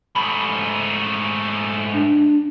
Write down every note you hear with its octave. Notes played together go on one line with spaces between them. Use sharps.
G#2 A3 B5
D4